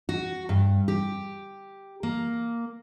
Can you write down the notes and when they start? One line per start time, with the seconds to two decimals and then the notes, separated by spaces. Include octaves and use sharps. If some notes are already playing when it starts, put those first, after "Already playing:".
0.09 F#4
0.49 G2
0.88 G4
2.03 A#3